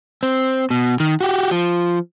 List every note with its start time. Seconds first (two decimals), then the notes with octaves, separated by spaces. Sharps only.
0.23 C4
0.70 B2
1.00 D#3
1.21 F#4 G4
1.51 F3